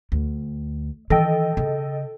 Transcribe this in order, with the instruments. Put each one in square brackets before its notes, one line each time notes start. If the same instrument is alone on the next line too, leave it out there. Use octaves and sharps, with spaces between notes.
[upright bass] D2
[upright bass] D#3 E3 [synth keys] A4 D#5 G5
[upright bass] C#3